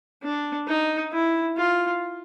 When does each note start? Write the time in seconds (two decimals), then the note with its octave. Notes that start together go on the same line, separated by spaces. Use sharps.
0.23 D4
0.67 D#4
1.12 E4
1.57 F4